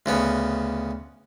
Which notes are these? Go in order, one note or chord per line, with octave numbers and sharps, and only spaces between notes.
D2 C#3 B3